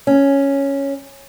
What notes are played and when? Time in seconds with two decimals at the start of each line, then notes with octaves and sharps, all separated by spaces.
0.07 C#4